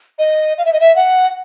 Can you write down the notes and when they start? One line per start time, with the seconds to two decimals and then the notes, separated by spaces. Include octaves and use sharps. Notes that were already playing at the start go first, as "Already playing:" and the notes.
0.19 D#5
0.58 F5
0.65 E5
0.73 D#5
0.80 E5
0.96 F#5